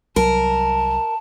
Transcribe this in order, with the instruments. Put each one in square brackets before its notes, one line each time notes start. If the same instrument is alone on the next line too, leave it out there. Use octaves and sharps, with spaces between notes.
[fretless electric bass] C2 F#3 [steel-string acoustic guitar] A#4 [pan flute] A5